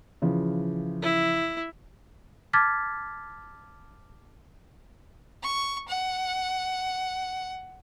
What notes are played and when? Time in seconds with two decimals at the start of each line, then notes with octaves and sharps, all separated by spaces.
0.22 C#3 E3 F3
1.02 E4
2.53 A5 D6 F6 G#6 A6 B6
5.43 C#6
5.88 F#5